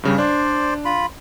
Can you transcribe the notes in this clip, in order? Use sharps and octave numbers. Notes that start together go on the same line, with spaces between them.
G2 C#3 G3
D4 C5 D5
F4 B5